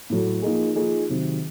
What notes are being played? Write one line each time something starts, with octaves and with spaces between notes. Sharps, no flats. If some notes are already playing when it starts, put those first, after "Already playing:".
A2 F#3 A3
F3 A#3 D#4 G#4
F3 A#3 D#4 G#4
C3 D#3 F#3